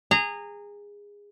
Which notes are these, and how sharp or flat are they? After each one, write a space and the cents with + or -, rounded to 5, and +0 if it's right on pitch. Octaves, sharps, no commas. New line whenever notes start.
G#4 -20 A#5 -20